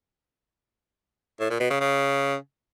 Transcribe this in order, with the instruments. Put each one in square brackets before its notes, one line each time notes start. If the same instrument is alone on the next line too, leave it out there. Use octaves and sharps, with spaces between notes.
[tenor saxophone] A2
A#2
B2
C#3
C#3